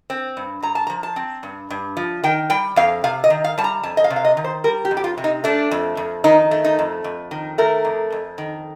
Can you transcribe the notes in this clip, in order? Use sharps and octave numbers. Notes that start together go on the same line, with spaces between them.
C4
G2
G2 A#5
A5
A#5
F3
A5
C4
G2
G2
F3
D#3 G5
G3 G5
F2 F5
C3 F5
D#5
D#3
F5
G3 A5
A#5
F2 A5
D#5
F5
C3
F5
D#5
D#3
C5
G3 A#4
G4
F2
G4
F4
C3
D#4
A3 D4
F2
F2
D#3 D#4
A3
D#4
F2
F2
D#3
A3 A#4
F2
F2
D#3